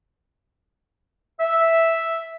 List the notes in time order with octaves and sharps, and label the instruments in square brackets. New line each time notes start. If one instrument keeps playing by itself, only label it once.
[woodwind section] E5